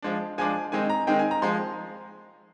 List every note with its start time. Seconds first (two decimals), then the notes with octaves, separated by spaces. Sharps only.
0.03 F3 G#3 D4
0.38 F3 G#3 D4 G#5
0.72 D#3 G#3 C4 D#4 G#5
0.90 A#5
1.07 D#3 G#3 C4 D#4 G5
1.19 G#5
1.31 A#5
1.42 F3 G#3 D#4 C6